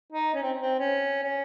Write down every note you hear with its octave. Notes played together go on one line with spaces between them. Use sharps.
D#4
C#4
C4
C4
C#4
C#4